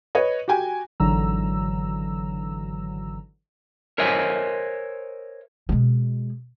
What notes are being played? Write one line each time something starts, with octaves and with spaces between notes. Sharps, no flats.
B4 C#5 D#5
F#4 G4 G5 G#5
G#1 D3 E3 F#3 A#5 E6
A#4 C5 C#5 D#5 E5 G#5
B2 G#3